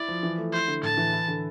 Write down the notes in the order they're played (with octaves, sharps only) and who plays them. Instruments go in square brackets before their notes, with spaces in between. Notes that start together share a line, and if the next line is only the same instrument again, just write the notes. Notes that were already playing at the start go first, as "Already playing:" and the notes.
Already playing: [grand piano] E4 [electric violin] D5
[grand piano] F3
E3
A3
[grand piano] E4 [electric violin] C5
[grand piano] D3
[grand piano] A2 [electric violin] A5
[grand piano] E3
E4
D3